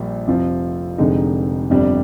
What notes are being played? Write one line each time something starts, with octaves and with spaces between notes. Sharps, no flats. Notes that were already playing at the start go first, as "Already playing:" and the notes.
Already playing: A#1 A#2 G3
F1 F2 C3 F3
F1 F2 D3 G#3 D#4
G1 F2 C3 G3 D4